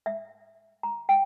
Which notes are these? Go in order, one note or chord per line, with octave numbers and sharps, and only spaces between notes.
E5
A#5
G5